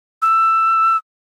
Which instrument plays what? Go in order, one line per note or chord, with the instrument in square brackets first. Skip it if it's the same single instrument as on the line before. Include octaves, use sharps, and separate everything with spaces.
[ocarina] E6